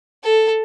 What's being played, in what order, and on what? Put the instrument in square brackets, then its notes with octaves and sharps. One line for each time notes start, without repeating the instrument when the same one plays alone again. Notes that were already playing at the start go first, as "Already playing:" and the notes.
[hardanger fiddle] A4